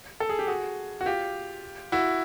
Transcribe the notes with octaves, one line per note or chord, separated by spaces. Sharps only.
A4
G#4
G4
F#4 G#4
F#4
F4 G4
E4 F#4